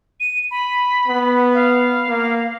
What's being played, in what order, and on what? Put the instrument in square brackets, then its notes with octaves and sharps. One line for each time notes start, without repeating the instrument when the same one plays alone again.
[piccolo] D#7
B5
[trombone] B3
[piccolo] F5
[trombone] A#3